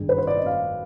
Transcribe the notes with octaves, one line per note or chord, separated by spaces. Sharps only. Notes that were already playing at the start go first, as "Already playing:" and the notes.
Already playing: G#1 G2 D3 G3 D4 G#4
B4
C5
D5
D#5
F5